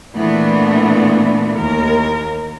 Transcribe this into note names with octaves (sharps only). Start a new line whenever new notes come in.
A#2 E3 A3 B3 D4
D#2 A#4